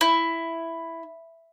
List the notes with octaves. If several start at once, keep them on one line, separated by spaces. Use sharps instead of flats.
E4